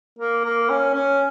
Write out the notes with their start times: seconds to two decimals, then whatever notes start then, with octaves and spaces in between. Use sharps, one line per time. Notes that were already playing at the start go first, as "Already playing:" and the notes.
0.19 A#3
0.44 A#3
0.70 C#4
0.94 C#4